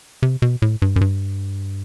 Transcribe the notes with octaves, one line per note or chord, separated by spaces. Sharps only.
C3
B2
A2
G2
F#2
G2